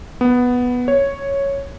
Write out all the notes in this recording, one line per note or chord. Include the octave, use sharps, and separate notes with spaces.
B3
C#5